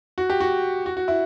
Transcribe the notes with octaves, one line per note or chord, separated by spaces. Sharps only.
F#4
G4
F#4
F#4
F#4
E4